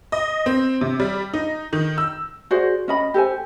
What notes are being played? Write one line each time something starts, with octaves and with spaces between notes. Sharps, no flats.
D#5
C4
C3
G3
D#4
D#3
E6
F#4 G#4 C5 D5
C#4 D#5 B5
G4 A4 C5 G#5